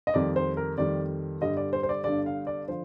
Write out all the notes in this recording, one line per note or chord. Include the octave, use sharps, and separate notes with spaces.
D#5
F2 D#3 G3 D5
C5
A#4
F2 D#3 G3 D5
G1 G2 D3 G3 D#5
D5
C5
C5
D5
G1 G2 D3 G3 D5
F5
D5
D3 F3 C5